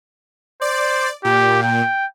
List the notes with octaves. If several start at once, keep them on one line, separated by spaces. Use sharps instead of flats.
C5 D5
A#2 G4
G5